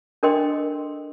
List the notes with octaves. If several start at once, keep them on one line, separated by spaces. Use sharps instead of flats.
D4 A4 A#4 D#5 G5 C6